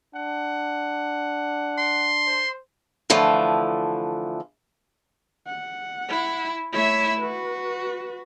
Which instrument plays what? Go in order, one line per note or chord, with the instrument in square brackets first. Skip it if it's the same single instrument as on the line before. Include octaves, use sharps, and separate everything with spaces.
[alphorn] D4 [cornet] F#5
[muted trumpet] C6
[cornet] C5
[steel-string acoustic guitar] D3 E3 F3 A3
[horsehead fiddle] F#5
[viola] E4
[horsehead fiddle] A3 C#5 [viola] E4 E5
[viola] F#4 [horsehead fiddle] B4